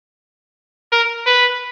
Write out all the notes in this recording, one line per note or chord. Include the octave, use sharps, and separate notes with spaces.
A#4
B4